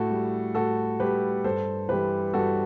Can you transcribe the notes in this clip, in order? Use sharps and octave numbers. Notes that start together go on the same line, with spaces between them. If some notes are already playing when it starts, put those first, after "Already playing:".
Already playing: A2 F#4 A4
G3
A2 F#4 A4
G3 G4 B4
G2 A4 C5
E3 G3 G4 B4
G2 F#4 A4